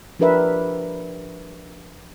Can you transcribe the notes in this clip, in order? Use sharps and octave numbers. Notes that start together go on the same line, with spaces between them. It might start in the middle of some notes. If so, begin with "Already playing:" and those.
F3 D4 G4 A#4 B4 E5